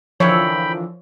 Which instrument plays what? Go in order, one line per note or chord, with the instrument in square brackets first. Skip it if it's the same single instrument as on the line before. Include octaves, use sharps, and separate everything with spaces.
[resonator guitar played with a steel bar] D3 E3 A#4 [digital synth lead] F3 [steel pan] C#5 [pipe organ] G5 B5